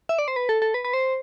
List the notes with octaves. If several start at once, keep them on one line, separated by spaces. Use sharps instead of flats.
E5
D5
C5
B4
A4
A4
B4
B4
C5